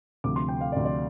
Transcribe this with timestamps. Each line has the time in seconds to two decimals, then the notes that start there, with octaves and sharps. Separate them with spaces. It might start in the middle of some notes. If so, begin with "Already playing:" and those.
0.24 D2 C3 F3 D6
0.36 C6
0.49 G5
0.61 F5
0.72 D2 C3 F3 D5
0.85 D5